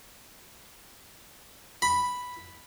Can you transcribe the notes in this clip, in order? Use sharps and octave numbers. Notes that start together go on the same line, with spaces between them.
B5